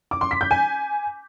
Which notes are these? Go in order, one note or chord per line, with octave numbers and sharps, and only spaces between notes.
D6
C6
B6
G6
G#5